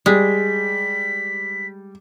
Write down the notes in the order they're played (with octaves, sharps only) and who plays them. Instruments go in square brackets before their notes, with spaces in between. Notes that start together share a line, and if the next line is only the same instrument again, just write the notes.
[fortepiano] G3 [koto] G#3 [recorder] B6